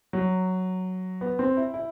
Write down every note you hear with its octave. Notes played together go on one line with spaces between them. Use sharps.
F#3
B3
C4
E4
E4